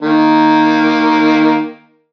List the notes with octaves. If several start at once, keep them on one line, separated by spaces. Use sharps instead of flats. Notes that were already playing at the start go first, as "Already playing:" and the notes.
D#3 A#3